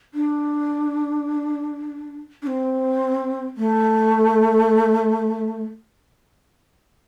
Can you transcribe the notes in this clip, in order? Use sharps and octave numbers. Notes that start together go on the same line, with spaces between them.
D4
D4
C4
A3